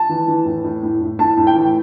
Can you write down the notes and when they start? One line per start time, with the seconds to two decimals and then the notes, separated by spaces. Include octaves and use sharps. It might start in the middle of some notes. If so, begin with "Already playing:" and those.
Already playing: A5
0.09 E3
0.28 E3
0.45 A2
0.64 A2
0.83 A2
1.01 A2
1.19 A2 A5
1.37 A2
1.47 G5
1.55 E3